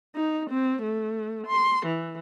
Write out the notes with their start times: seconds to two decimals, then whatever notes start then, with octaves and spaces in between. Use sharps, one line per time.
0.16 D#4
0.50 C4
0.83 A3
1.47 C6
1.86 E3